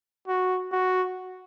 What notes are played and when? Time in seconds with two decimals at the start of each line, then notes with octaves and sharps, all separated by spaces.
0.28 F#4
0.72 F#4